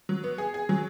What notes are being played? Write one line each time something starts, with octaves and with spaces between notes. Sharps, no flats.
F#3
B3
G#4
G#4
F#3